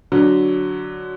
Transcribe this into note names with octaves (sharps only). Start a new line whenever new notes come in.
D3 F#3